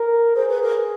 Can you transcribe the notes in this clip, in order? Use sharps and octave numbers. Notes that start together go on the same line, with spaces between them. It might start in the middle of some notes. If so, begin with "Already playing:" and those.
Already playing: A#4
G#4 C5
B4
A#4